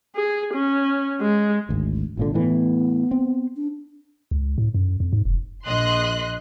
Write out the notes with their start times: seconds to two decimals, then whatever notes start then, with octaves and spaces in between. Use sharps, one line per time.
0.16 G#4
0.54 C#4
1.21 G#3
1.69 G#1 D2
2.17 G#1 A#2 D3 F4
2.34 A2 E3 B3
3.11 C4
3.56 D4
4.31 C#2
4.58 A2
4.74 F#2
5.00 F2
5.13 G#2
5.25 F1
5.65 A#1 D#5 C6 F#6